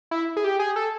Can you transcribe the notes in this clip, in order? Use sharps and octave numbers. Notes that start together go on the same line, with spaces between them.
E4
G#4
G4
G#4
A4